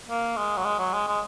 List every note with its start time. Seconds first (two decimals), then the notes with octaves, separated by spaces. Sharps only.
0.08 A#3
0.37 G#3
0.57 F#3
0.65 G#3
0.79 F#3
0.93 G#3
1.08 G#3